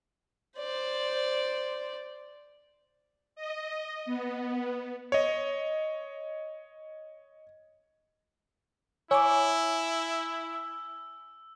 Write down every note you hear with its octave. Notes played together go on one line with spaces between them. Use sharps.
C5 D5
D#5
B3
C#5 D#5
E4 C#5 G#5 D6 E6